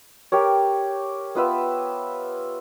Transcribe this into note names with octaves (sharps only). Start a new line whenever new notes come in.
G4 A#4 C#5
B3 F4 B4 E5